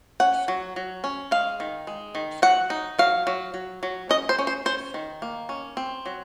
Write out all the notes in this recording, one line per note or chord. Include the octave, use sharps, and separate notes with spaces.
C#4 F#5
F#3
F#3
C#4
G#3 F5
D#3
G#3
D#3
F#3 F#5
D#4
F#3 F5
F#3
F#3
F#3
C#4 D#5
C5
C#4
C5
C#4 C5
D#3
A#3
C#4
C4
F#3